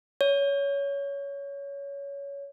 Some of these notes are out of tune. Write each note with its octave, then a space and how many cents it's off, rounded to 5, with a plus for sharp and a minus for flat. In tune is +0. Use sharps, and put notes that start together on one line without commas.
C#5 +20